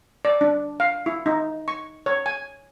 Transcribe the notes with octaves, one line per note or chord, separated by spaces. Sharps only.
D5
D4
F5
E4
D#4
C#6
C#5
G#5